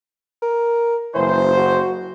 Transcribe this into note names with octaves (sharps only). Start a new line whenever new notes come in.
A#4
F#1 E3 C5
F#4